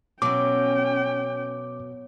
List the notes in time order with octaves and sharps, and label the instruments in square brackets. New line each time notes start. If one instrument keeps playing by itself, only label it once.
[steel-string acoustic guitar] B2 [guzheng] F#3 E4 [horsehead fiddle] C#4 G5 [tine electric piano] D6